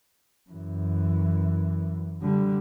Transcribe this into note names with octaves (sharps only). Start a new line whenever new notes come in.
F#2 E3
D3 G3